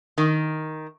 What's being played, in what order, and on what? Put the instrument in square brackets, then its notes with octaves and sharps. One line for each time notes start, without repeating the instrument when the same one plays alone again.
[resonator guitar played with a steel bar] D#3